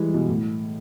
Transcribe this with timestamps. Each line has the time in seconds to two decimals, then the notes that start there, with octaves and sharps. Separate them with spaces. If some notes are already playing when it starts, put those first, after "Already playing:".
Already playing: E3 G3 G#3
0.14 B2
0.29 A2